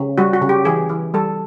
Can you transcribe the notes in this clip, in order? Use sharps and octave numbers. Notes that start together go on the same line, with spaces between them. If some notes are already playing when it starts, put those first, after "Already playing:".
Already playing: C#3
G3 F#4
F#4
C#3
G4
E3 G#4
E3
G3 A4